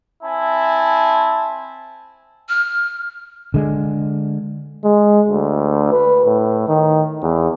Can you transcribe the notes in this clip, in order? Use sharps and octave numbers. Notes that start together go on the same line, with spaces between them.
C4 E4 G#5 A5
F6
D3 G#3
G#3
D2
B4
A2
D#3
E2